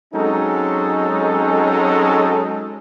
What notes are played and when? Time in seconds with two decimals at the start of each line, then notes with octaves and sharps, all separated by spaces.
0.14 F#3 G#3 C4 C#4 D#4 A4